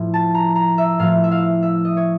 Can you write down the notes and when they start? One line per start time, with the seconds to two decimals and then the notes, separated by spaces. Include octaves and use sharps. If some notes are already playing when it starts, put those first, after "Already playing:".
Already playing: A2 F3
0.14 A5
0.34 A#5
0.55 A#5
0.78 E5
0.99 A2 F3 F5
1.24 E5
1.31 F5
1.62 E5
1.85 D#5
1.97 C#5